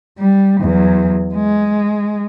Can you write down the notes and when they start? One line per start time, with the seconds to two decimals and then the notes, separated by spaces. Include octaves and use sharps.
0.19 G3
0.61 E2 F#3
1.35 G#3